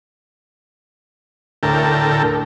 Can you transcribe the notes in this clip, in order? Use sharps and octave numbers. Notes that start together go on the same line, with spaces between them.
D2 A2 A#4 G5 A5